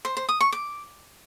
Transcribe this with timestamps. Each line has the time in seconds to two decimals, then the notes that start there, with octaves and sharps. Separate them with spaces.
0.05 C5
0.17 C5
0.29 D#6
0.41 C#6
0.52 D6